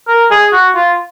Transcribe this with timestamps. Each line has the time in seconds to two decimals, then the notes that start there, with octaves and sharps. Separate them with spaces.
0.08 A#4
0.31 G#4
0.52 F#4
0.75 F4